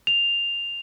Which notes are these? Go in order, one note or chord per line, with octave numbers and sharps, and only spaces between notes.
F7